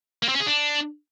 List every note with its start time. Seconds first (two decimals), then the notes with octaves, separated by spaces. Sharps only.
0.23 A#3
0.29 C4
0.34 C#4
0.40 G#4
0.46 D4